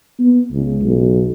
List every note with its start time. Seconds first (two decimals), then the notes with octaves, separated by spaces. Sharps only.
0.20 B3
0.52 C#2
0.83 B1